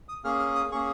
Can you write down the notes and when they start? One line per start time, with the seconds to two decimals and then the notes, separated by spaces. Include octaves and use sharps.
0.09 D#6
0.24 A#3 C#4 G#4 F6
0.39 F6
0.55 D#6
0.71 A#3 C#4 G#4 C#6